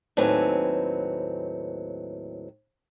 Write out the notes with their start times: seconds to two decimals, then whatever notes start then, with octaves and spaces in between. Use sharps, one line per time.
0.17 D#2 A2 F#3 C4 B4 G#5